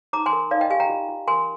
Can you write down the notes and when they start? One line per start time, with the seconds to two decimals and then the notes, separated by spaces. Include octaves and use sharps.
0.13 D#4 A#5 D6
0.26 G#5 C6
0.33 A#4
0.51 D#4 D5 F5
0.61 D#5 G5
0.70 G4 F5 G#5
0.80 G5 A#5
0.90 F4
1.09 F4
1.28 A#4 G#5 C6